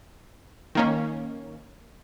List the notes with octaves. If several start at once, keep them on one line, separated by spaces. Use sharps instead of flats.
D#3 A#3 C#4